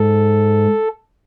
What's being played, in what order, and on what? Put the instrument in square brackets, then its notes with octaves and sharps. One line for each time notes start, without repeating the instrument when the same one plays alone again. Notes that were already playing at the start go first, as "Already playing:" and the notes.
Already playing: [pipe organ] G#2 A4